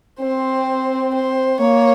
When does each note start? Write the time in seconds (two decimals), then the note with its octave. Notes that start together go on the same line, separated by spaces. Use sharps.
0.20 C4 C5
1.14 C5
1.60 A#3 C#5